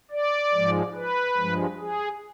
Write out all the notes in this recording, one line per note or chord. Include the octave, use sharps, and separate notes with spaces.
D5
G#2 F3 G#3
B4
G2 F3 G#3
G#4